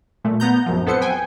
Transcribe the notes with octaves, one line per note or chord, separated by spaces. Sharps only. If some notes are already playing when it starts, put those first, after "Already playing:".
A#2 A3
B3 A#5 G6
A#1 F#2 F3
F2 B3 A4 B4 C5 C#7
G5 G#5